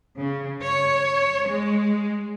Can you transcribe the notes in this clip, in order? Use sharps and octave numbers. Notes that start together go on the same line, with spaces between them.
C#3
C#5
G#3